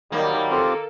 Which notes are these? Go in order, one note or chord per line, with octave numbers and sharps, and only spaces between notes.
D#3 F#3 G3 A#3
C4 F4 G4 A4